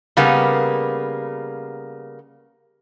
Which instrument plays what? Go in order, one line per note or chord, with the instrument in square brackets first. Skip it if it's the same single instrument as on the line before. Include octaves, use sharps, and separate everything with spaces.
[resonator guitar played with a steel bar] C#3 G3 A#3 B3